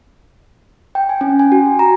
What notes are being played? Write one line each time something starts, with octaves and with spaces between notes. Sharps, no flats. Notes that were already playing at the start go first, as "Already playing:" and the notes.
G5
G#5
C#4
G#5
F#4
A#5